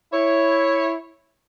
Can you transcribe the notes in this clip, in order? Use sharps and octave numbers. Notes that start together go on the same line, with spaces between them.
E4 C#5